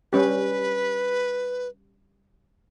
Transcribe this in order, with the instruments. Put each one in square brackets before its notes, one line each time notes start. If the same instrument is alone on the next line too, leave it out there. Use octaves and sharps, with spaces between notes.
[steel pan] G3 C#4 G4 [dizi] B4